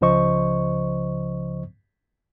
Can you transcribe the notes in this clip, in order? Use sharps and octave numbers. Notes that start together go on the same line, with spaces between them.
C#2 C#3 F3 C5 D#5 C#6